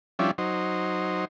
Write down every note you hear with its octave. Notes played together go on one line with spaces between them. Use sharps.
F3 G3 C#4 D4 E4
F#3 D#4 C5